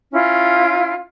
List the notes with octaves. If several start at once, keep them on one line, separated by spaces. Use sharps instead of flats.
C#4 E4 F4